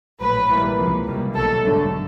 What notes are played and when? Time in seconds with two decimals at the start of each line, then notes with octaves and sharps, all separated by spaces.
0.21 A#1 A2 F#3 B4
0.49 A#1 G#2 E3 G3 A#3
0.78 C#2 C3 F3 A#3
1.07 D#2 D#3 G3 A#3
1.35 B1 B2 F#3 A3 A4
1.64 G#1 G2 D3 F#3 A3